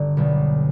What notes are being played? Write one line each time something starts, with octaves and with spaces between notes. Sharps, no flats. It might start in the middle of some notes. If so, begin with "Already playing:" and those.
Already playing: G1 D3 D4
B1 B2 G3